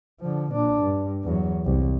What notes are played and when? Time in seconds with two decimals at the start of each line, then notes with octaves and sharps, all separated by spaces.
0.20 D3 F3
0.52 A#2 D4
0.82 G2
1.24 E2 F#3
1.65 C2